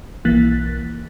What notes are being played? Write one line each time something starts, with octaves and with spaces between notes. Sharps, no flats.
B1 E3 A#3 F#6 A6 B6